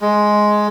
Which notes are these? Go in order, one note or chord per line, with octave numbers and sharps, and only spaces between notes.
G#3